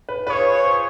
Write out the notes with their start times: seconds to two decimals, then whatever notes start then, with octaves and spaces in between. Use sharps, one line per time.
0.09 B4
0.27 F4 G#4 B4 C#5
0.65 C5